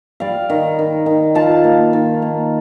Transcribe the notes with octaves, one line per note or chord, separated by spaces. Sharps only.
G3 D5 F5
D#3
D#3
D#3
F4 F5 A5
A#3
D#3
A#3